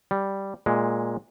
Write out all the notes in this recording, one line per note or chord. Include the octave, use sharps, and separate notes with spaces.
G3
A#2 G#3